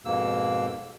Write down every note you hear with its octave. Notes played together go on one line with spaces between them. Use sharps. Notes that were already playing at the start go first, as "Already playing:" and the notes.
F2 G#2 B2 A#3 E6